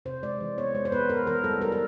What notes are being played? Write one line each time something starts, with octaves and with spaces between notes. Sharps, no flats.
C3 C5
G#3 D5
E3
B3 C#5
G#3 C5
C5
B3 B4
B3 A#4
E3 A#4
G3 A4
G3 A#4
A#4